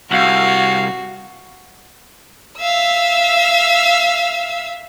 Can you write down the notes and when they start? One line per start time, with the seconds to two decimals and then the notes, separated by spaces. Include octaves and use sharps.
0.11 C2 F#4 F5
2.58 E5 F5 E6